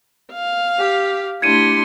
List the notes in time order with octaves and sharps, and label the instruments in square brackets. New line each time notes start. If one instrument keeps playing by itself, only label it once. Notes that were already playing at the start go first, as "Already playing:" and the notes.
[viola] F5
[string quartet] G4
[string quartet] A3 D4 G4 [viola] E4 C6 [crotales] G#6 C#7 D#7